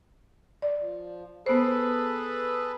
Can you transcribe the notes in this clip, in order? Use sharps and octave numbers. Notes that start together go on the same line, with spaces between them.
D5
F3
B3 G#4 A4 B4 C5